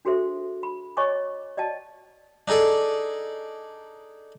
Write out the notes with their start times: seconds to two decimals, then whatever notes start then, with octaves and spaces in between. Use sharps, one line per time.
0.05 D4 F#4 G#4 A4 C5 E5
0.63 B5
0.97 C#5 D#5 G#5 C#6 D6
1.57 D5 D#5 G5 A5
2.48 D4 D#4 G#4 A4 D5